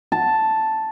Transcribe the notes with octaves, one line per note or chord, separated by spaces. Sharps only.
A5